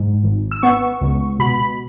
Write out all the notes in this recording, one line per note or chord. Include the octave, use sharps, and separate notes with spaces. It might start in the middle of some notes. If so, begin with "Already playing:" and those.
Already playing: G#2
G#1
E6
B3 C#6
C#2
B2 B5